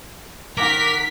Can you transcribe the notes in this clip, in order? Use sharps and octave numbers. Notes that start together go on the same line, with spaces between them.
D#3 A#4 F#5 D6 B6